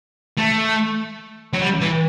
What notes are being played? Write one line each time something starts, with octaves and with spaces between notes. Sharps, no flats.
A3
F#3
G3
E3